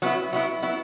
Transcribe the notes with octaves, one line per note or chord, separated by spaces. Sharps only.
F#3 B3 E4
F#3 B3 E4
F#3 B3 E4